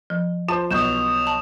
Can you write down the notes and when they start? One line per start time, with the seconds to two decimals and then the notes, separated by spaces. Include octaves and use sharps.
0.10 F3
0.49 F4 C5 A5
0.71 B1 B2 D#6 G6 E7
1.27 A5